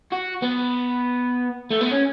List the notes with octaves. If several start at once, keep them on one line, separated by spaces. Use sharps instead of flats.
F#4
B3
A3
B3
C#4